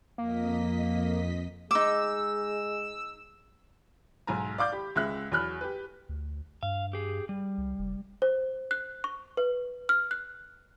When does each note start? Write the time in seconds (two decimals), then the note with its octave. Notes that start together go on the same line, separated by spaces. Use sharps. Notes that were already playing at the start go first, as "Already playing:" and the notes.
0.18 F2 A#3 D#5 B6
1.71 G#3 D#4 D6 E6
4.27 B1 G#2 G#5 A#5
4.58 D5 F5 D6 G6
4.72 G4 B5
4.96 C#2 G#3 E5 F#6
5.32 E2 F#3 B5 F6 F#6
5.61 G4 B4
6.09 D2
6.63 G2 F5
6.93 G4 G#4
7.29 G3
7.58 C2
7.79 F1
8.22 C5
8.71 F#6
9.04 C#6
9.37 B4
9.89 F6
10.11 F#6